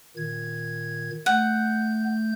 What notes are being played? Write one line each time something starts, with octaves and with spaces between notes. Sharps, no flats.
A#2 D#3 G#6
A3 F#5 G6